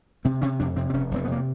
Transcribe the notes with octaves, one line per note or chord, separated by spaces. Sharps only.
C3 C4
C3 C#4
F2 D4
C3 C4
C4
F1 C#4
F1 C4
B3
C3 A#3